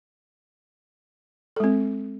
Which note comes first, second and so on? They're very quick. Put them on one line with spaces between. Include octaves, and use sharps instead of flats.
A4 G#3 C4